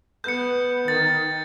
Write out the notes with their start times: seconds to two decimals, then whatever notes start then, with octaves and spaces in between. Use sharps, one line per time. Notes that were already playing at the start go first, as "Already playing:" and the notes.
0.24 B3 G6 C#7
0.88 D#3 A6